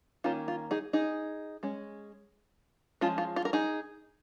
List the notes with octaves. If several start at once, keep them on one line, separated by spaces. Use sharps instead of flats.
D#3 A#3 C#4 F4
F4
D#4 G#4
D#4 G#4
G#3 C#4
F3 G#3 C#4 F4
F4
F4
A#4
D#4 G#4